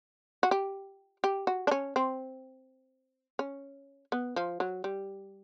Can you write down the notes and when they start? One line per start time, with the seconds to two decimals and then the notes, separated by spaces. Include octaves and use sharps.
0.43 F#4
0.51 G4
1.24 G4
1.47 F#4
1.67 D4
1.71 C#4
1.96 C4
3.39 C#4
4.12 B3
4.36 F3
4.60 F#3
4.84 G3